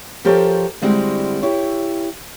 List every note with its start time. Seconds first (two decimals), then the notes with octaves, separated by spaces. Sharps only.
0.25 F3 G4 A4 A#4 C5 C#5
0.82 D3 G3 G#3 C4 E4 F#4
1.43 E4 G4 C#5